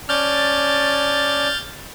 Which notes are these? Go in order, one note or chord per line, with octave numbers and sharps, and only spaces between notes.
C#4 D5 A5 F6 G6 A6